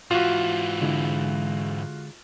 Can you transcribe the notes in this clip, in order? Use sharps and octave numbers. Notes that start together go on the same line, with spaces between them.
G#2 E3 F4 F#4
D3 G#3 E4